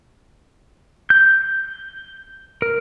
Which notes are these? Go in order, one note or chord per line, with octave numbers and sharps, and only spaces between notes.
G6
A#4